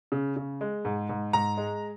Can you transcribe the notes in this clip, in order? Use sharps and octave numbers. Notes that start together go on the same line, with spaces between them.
C#3
C#3
G#3
G#2
G#2
G#2 A#5
G#3